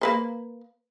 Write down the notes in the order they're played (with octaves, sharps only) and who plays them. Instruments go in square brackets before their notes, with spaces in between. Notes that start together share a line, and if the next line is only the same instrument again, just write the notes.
[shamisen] A#3 B4 C5